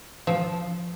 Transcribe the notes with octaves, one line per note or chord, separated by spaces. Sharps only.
F3